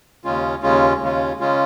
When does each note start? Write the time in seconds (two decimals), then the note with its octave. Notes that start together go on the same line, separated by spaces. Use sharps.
0.24 D#2 C#3 G#3 C#4 F4
0.62 D#2 C#3 G#3 C#4 F4
1.01 D#2 C#3 G#3 C#4 F4
1.40 C#3 G#3 C#4 F4